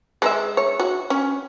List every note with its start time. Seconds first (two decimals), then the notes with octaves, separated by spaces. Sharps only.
0.22 G#3 A#4 E5
0.57 C#5
0.80 F#4
1.10 C#4